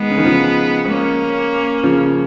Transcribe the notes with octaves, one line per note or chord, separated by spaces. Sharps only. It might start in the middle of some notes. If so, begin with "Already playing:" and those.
Already playing: D#3 G#3 B3
C#3
D#3
C#3 F3
A#3 C#4
C#3 F3